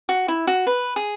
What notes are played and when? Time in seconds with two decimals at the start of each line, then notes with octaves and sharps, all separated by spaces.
0.09 F#4
0.28 E4
0.47 F#4
0.67 B4
0.96 G#4